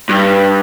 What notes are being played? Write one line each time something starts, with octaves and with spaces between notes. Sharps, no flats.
G2